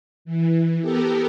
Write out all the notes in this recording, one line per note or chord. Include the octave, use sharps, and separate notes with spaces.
E3
B3 G4 A4 A#4